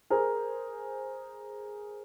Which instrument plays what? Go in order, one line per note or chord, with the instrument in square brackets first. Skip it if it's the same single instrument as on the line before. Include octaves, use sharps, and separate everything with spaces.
[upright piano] G#4 A#4 C5